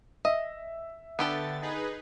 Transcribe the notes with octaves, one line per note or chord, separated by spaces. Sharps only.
D#5 E5
D3 B3 G4 A4 A6
D#4 G#4 B4